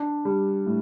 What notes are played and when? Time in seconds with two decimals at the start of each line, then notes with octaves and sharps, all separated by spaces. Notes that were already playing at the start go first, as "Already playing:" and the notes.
Already playing: D4
0.25 G3
0.66 A2